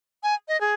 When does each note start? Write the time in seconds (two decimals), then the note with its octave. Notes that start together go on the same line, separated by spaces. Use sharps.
0.23 G#5
0.48 D#5
0.61 G#4